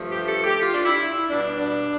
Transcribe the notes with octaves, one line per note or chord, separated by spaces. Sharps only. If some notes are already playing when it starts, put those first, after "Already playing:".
Already playing: G2 F3 A3
G4
A4
G4
F4
D4
E4
B2 G3 D4